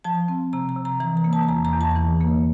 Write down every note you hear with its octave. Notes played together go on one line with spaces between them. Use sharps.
F3 A5
C4
C3 A#5
A#5
C3
A#5
E3 A#5
A#5
A#3
A5
E2 A#5
A#5
E2
A5
E3
A#3